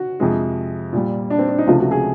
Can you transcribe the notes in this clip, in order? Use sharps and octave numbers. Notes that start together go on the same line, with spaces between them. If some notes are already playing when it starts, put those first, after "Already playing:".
Already playing: F#4
F2 C3 F3 G#3
A#2 G3
D4
C4
D4
D#4
C#2 C3 F3 A3 F4
F#4
G#4